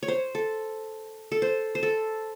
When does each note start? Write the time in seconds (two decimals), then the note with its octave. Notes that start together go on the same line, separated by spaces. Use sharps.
0.03 C#5
0.08 C5
0.35 A4
1.32 A4
1.42 C5
1.75 C5
1.83 A4